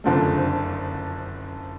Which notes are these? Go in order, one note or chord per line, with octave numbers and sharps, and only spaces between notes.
F#1 F2 D3 F3 A3